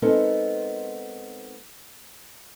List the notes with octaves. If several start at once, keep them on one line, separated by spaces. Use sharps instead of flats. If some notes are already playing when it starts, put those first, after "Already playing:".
G#3 B3 C4 D#4 A4 A#4